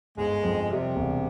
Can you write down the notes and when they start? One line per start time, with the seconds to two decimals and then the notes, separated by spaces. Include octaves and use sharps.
0.17 G1 G#2 G#3
0.44 F2
0.70 C3 G3
0.96 E1